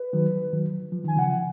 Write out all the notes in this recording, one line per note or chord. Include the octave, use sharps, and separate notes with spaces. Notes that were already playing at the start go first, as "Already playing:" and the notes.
Already playing: B4
D#3 F#3
D#3 F#3
F3
D#3 G#5
C#3 F3 F#5